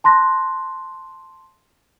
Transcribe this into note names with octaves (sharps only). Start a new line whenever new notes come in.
A5 C6 F#6 A#6